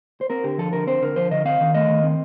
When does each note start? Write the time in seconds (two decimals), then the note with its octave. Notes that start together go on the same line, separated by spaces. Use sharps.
0.21 C5
0.30 C4 A#4
0.44 D3 G4
0.58 F3 A4
0.73 D3 A#4
0.87 C4 C5
1.02 D3 A#4
1.16 F3 C5
1.31 D3 D#5
1.45 C4 F5
1.61 D#3
1.74 A3 D#5
1.89 D#3
2.04 C4